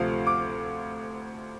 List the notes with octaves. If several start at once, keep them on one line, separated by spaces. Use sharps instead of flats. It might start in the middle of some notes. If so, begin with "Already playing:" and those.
Already playing: D2 C3 F3 A3 F5
D6